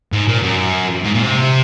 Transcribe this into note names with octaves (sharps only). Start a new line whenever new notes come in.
G#2
A#2
F#2
G#2
A#2
C3